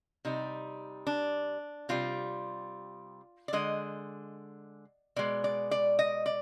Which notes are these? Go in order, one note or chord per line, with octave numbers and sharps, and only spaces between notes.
C3 G3 D#4
D4
C3 G3 F4
D5
D3 G#3 D#5
B2 G#3 D5
D5
D5
D#5
D5